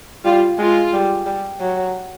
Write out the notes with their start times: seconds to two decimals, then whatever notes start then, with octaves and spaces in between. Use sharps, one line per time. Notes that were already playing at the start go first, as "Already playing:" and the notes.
0.25 G3 F4
0.58 G#3 F4
0.93 G3
1.26 G3
1.61 F#3